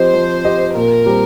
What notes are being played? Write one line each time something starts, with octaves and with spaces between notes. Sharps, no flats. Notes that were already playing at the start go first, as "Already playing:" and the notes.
Already playing: F3 C4 G4 C5 D#5
F3
C4 G4 D#5
A#2 A#4
G3 C4 G4